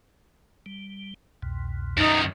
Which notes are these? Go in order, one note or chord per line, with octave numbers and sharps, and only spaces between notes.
G3
C2 F2 B2
F#2 D#3 D#4